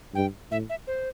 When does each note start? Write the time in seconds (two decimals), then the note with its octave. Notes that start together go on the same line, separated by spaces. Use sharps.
0.15 G2 G5
0.51 A2 E5
0.70 E5
0.87 C5